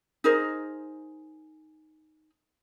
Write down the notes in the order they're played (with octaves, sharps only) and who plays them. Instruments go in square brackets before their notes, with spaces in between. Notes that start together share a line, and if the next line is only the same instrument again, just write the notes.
[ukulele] D#4 G#4 A#4 C5